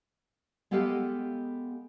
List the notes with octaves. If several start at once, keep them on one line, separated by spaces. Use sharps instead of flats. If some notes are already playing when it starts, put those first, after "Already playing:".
G#3 B3 G4 A4 D#5 F5